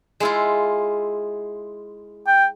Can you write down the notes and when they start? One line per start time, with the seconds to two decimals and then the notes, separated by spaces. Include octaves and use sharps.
0.20 G#3 E4 F4
2.27 G5